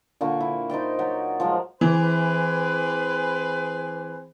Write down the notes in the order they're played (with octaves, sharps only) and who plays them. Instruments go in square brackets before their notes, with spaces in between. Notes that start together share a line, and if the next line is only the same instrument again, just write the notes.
[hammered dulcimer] A#2 D3 A#3 C#6
E4
D#4 C5 D5 G5
F#3 F#4 G4
F3 F#3 G#3
[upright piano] E3 [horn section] C4 G#4 B4